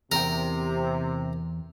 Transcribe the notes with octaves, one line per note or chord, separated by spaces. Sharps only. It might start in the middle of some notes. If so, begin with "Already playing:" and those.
E2 C3 A#4 G5